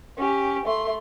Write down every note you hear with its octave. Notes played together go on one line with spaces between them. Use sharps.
C#4 G4
A3 C6